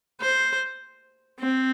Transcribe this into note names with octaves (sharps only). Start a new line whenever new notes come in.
C5
C4